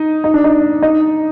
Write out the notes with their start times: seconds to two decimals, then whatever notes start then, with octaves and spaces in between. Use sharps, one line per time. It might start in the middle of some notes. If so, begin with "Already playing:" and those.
Already playing: D#4
0.24 D#4
0.34 D4
0.44 D#4
0.82 D#4